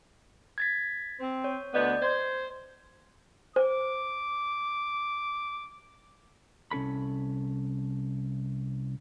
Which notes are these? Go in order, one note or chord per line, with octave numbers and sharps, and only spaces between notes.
G#6 A6 B6
C4
C#5
D2 B3 D5 D#5 G6
C5 G#6
C5 D6
C2 C#4 A4 B5